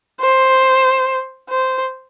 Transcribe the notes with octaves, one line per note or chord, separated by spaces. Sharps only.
C5
C5